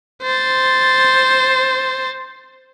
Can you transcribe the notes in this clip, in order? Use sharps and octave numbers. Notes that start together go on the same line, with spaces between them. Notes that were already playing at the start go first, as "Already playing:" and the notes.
C5 A6